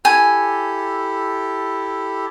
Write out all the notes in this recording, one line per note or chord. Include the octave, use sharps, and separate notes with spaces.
E4 G4 A4 G#5